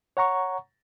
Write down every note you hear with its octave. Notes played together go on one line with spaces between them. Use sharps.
C#5 F#5 A#5 C#6